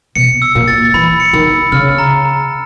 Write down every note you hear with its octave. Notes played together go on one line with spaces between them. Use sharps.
B2 C#7
E6
A#2
A6
E3 B5
C#7
D#3
E6
C#3 F6
A#5
A#5